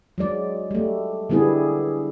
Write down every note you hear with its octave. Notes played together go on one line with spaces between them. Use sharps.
F#3 G#3 D5
G3 A3
D3 G3 B3 E4 G#4